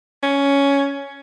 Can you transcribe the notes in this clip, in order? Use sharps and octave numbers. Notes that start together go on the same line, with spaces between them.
C#4